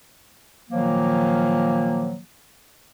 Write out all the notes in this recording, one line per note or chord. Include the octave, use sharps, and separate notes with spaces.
A#2 D#3 F3 F#3 A#3